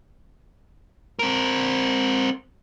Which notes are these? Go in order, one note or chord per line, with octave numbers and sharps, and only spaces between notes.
C4 A#4